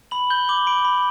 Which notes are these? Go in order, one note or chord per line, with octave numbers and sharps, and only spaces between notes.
B5 F#7
G6 G7
D6 F#7
B5 D7
B5